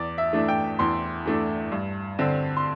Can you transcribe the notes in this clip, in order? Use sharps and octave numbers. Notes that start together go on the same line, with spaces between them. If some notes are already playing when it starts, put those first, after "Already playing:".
Already playing: E2 D5
E5
E3 A3 D4
G5
E2 C6
E3 A3 D4
G2
D3 C4
C6